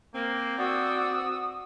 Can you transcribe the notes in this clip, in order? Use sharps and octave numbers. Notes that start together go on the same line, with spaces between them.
A#3 C4
F#4 D5 D#6 E6